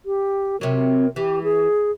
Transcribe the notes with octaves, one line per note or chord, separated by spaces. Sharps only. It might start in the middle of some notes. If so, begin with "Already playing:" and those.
G4
C3 F#3 A#4
E3 G4
G#4